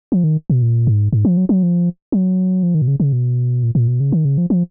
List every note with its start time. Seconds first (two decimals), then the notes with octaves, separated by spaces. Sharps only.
0.12 F3
0.24 D#3
0.50 B2
0.62 A#2
0.87 G#2
1.13 G#2
1.25 F3
1.37 F#3
1.49 F#3
1.63 F3
2.12 F#3
2.63 F3
2.75 D#3
2.82 B2
2.88 C#3
3.00 C#3
3.13 B2
3.63 A#2
3.75 A#2
3.88 B2
4.00 C#3
4.12 D#3
4.25 C#3
4.38 F3
4.50 F3